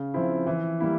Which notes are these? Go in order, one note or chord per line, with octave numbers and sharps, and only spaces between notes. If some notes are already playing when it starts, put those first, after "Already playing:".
Already playing: C#3
F3 C4 E4
E3
G3 A#3 E4